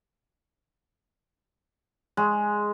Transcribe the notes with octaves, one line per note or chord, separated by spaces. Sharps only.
G#3